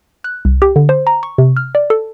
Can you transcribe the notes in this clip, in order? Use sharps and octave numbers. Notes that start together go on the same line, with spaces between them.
F#6
C2
G4
D3
C5
A#5
C#6
C3
F6
D5
A4